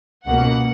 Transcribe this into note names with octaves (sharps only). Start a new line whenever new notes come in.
C#2 B2 A#3 F#5